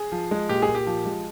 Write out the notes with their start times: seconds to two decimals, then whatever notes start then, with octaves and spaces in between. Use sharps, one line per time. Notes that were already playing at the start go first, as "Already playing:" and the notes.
Already playing: G#4
0.12 F3
0.31 G#3
0.49 A#2 G4
0.62 G#4
0.68 A#2
0.75 G4
0.87 F3
1.06 G#3